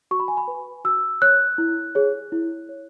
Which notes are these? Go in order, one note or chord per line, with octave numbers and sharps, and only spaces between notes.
F#4 C#6
B5
G#5
B5
B4
F#4 E6
C#5 F#6
E4
G#4 C#5
E4
C#5